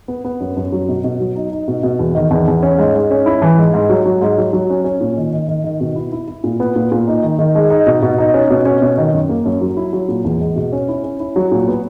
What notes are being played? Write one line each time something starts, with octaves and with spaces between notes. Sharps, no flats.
B3
B3
F#2
F#2
F#3
B2
B2
F#3
D#4
D#4
B2
B2
E2
D#3
E2
E2
C#4
G#2
G#2
C#4
E4
E3
G#2
G#2
F#3
F#3
G#2
F#3
F#3
C#4
C#4
A#2
D#3
D#3
D#3
D#3
B2
E4
E4
E4
A#2
B3
A#2
A#2
D#4
D#3
D#3
G#3
D#4
B2
B2
D#4
C#4
B2
C#4
B2
D#3
F#2
A#3
F#2
F#3
E4
F#3
A#2
E2
G#3
B2
C#4
E4
C#4
E4
F#3
A#2
B3